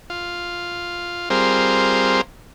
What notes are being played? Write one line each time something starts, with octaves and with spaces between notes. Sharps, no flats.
F4
G3 C4 F4 G#4 A#4 C5